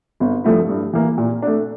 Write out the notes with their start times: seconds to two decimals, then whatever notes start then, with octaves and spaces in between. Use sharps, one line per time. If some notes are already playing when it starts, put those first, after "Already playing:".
0.20 G1
0.44 G2 F3 A3 E4
0.69 G2
0.93 E3 A#3
1.18 A#2
1.42 A3 D4